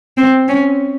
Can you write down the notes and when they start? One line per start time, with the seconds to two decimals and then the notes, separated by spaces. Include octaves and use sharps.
0.18 C4
0.48 C#4